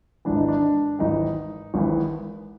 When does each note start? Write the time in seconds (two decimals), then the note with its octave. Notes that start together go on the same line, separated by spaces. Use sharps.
0.25 G#1 G#2 E3 D4
0.37 D#4
0.48 D4
0.99 G#1 G#2 E3 D#4
1.74 G#1 G#2 E3